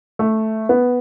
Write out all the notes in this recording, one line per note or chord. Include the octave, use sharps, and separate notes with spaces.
A3
B3